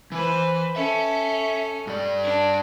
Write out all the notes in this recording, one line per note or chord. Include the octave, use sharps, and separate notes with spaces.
E3 B4 C5
C#4 A4 E5
G2 D5
D4